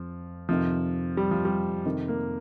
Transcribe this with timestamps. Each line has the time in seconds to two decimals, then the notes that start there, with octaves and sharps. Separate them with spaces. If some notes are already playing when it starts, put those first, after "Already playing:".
Already playing: F2 F3
0.49 F2 C3 D#3 F3
1.17 G3
1.31 F3
1.45 G3
1.85 F2 C3 D#3
2.08 A#3